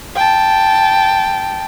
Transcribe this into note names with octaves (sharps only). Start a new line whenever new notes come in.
G5 A5